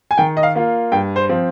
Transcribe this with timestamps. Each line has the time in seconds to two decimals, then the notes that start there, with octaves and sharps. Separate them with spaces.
0.11 G#5
0.18 D#3 G5
0.37 D#5
0.43 F5
0.55 A#3 F4
0.92 G2 G5
1.16 C5
1.29 F3 C4